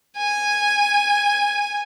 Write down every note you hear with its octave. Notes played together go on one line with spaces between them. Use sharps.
G#5